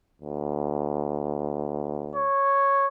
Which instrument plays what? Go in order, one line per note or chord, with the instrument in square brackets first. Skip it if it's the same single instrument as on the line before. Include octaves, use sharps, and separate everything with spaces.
[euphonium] D2
[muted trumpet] C#5